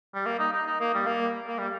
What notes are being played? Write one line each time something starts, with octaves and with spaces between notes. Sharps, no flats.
G3
A#3
D#4
D#4
D#4
A#3
G3
A#3
A#3
G3